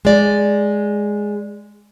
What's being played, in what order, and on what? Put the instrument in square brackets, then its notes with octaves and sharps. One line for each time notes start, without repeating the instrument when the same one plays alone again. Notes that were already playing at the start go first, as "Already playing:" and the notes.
[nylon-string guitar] G#3 D5